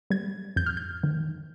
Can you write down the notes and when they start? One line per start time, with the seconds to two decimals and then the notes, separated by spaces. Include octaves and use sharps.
0.10 G3 G#6
0.56 F2 G6
0.66 F6
0.77 G6
1.03 D#3